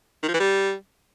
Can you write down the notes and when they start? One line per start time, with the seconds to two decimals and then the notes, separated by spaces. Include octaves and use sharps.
0.23 D#3
0.28 F3
0.34 E3
0.40 G3